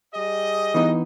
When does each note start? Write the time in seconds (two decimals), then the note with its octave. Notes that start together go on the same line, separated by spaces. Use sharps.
0.14 G3 G#4 D#5
0.74 E3 B3 D#4